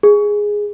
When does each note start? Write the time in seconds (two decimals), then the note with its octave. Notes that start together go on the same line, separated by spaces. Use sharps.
0.03 G#4